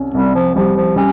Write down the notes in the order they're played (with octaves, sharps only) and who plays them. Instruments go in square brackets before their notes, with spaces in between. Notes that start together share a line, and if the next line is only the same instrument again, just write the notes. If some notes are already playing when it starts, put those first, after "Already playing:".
Already playing: [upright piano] C2 C#4
[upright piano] C2 [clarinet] G3
[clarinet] F3
[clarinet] F3 [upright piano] G3
[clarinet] F3
[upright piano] G3 [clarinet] C#4